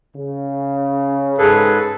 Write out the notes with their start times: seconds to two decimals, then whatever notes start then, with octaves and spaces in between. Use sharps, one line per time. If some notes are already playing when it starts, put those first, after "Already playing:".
0.15 C#3
1.39 G#2 G#4 A4 B4